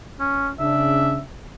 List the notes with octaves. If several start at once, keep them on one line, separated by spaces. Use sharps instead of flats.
C#4
C#3 D4 E5